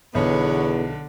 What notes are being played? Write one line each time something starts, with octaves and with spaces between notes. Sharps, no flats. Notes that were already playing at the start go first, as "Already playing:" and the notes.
B1 E2 D3 B3 C#5